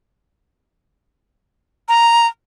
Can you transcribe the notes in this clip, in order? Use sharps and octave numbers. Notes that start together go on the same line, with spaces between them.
A#5